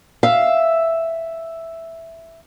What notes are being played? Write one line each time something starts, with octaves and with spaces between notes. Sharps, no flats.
E5 F5